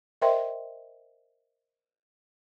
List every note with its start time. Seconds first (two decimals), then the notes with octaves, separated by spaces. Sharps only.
0.22 A#4 C5 D#5 E5 G5 C6